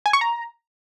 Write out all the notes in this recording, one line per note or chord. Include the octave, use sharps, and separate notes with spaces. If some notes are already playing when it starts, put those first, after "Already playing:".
G#5
C#6
A#5